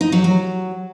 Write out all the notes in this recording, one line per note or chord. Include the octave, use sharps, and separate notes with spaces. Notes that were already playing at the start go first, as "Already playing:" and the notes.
D#4
F#3
F#3